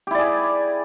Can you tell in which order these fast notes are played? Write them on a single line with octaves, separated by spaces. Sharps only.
G4 E4 D5 G#4